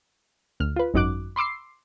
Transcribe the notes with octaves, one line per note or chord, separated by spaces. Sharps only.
D2 F6
F4 B4
G#1 F#2 D#4 F#4 D6 F#6
B5 C6 D6 E6 C7